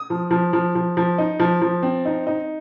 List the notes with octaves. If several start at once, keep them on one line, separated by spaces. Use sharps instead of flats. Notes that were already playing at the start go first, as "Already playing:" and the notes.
Already playing: D#6
F3
F3
F3
F3
F3
D#4
F3
F3
C4
D#4
D#4